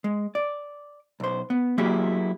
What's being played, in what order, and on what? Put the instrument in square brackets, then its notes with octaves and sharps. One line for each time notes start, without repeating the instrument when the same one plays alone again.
[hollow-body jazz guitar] G#3
D5
B1 C5
B3
F#3 A#3 E4 G4 G#4